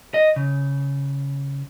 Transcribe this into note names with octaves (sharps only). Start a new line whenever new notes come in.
D#5
C#3